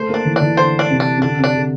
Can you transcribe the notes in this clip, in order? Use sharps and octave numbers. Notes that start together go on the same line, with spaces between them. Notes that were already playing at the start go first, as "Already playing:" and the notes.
Already playing: A3 C5
A#3 D4
E3
E3 D4
D3 C5
D4
C3
D4
C3
D3 D4
C3
D4
D3